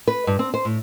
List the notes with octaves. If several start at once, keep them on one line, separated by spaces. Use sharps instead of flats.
B4
G2
C4
C5
A2